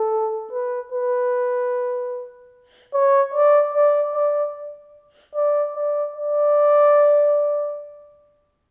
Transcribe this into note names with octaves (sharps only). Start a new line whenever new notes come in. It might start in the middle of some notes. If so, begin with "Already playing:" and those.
Already playing: A4
B4
B4
C#5
D5
D5
D5
D5
D5
D5